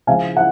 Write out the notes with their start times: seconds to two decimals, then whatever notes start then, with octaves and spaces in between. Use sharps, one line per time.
0.07 C#3 F3 F5 G#5
0.37 F#5